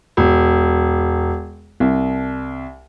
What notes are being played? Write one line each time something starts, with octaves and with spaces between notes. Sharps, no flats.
E1
C2